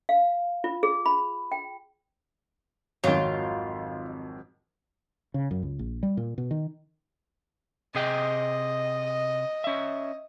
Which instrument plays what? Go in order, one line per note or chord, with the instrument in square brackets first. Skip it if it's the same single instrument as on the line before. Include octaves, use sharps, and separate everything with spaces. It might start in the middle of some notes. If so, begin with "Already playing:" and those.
[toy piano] F5
F4
G#4
B5
G5
[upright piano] G#1 F2 [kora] D#3 F#3 [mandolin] F4
[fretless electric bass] C#3
F#2
C#2
A#1
G3
A#2
B2
D#3
[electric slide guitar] C3 G#4 G5 [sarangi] D#5
[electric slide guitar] C#4 E5